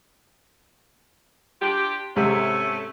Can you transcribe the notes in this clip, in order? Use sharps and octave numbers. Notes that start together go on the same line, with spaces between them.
D4 F4 G4
G#2 C3 A3 C#4